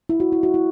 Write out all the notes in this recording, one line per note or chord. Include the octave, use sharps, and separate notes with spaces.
E4
F#4
E4
F#4
E4